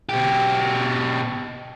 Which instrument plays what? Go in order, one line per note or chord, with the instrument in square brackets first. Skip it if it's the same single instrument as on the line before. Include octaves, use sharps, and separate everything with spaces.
[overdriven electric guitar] B2 G4